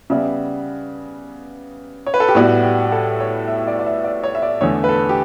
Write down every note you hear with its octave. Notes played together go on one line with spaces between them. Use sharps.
C#3 G3 B3 E5
C#5
B4
A4
G4
A2 G3 B3 F#4
G4
A4
C#5
E5
D5
D5
E5
D5
C#5
E5
D5
E2 D3 A3 C#5
B4
A4
G4